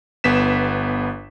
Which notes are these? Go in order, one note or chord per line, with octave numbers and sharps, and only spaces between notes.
G1 B3 B6 E7